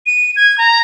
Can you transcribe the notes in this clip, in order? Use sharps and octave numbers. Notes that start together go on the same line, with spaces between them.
D#7
G#6
A#5